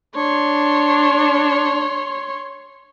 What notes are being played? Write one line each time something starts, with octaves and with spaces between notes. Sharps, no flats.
D4 C#5 C6